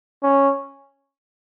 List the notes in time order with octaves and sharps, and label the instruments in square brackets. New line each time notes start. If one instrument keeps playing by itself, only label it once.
[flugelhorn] C#4